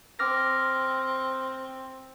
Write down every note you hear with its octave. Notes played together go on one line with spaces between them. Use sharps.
C4 D6 F6 A#6